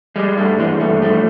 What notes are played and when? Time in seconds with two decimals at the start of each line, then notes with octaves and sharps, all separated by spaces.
0.16 G3 G#3
0.37 G2 A3
0.59 E3 G#3
0.80 G2 A3
1.02 F3 A3